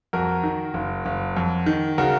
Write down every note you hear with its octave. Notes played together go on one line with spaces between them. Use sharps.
F2 F#4 A#4
D#3
F#1
F#1
F2
D#3
C#3 F#4 A#4